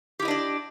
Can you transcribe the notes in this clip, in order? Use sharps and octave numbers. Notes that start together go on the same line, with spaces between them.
D4 E4 G4 D5 D#5